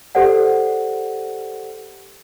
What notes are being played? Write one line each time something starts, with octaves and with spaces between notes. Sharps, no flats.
G4 A4 C5 D5 F#5